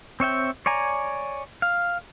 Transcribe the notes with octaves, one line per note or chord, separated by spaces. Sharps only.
C4 C#5 E5 G5
C#5 D5 G#5 A#5
F5